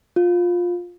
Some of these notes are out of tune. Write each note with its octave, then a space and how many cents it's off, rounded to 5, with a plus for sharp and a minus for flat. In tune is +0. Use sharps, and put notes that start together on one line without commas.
F4 +15